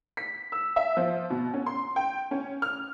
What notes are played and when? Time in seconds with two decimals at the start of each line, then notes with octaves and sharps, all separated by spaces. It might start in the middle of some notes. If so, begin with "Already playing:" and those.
0.17 B6
0.52 E6
0.76 E5
0.97 F3
1.30 B2
1.54 C#4
1.66 C6
1.96 G5
2.31 C#4
2.62 F6